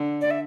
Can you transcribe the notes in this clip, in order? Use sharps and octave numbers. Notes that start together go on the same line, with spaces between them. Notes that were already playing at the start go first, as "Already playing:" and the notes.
Already playing: D3
D5
E5